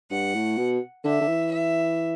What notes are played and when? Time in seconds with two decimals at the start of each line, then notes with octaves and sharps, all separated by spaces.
0.11 G2 F#5
0.35 A2
0.58 B2
1.04 D3 E5
1.21 D3
1.28 E3
1.51 E5